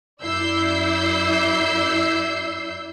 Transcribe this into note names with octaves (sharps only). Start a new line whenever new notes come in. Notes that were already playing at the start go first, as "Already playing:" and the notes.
F#2 E4 D5 E6 G6 C7